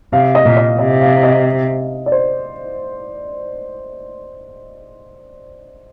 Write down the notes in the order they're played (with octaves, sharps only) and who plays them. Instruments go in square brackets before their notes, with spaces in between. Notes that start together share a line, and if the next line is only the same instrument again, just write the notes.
[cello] C3 [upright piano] F5
[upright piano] D#5
[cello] A#2
[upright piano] D#5
[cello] C3 [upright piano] D#5
[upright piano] F5
D#5
D5
C5